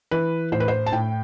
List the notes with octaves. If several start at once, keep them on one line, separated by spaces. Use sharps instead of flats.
E3 B4
A2 C5
B4
C5
A5
A2 G5